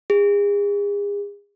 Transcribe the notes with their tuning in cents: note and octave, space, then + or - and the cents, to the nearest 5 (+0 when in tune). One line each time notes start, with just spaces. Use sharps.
G#4 -35